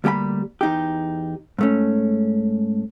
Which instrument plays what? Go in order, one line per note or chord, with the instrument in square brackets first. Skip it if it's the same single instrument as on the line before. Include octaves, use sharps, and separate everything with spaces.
[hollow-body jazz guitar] D2 G3 A#3 G5 B5
E2 D#4 G4
G#2 A3 C#4